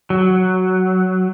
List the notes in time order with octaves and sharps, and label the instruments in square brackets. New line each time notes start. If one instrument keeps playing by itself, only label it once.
[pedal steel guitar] F#3